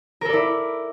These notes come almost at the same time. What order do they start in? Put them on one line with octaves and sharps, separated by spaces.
A#4 A4 D5 E4